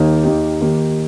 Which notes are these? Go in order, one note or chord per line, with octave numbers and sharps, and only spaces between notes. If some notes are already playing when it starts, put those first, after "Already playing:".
Already playing: D#2 D#3 A#3 D#4 G4
D#2 D#3 A#3 D#4 G4
D#2 D#3 A#3 D#4 G4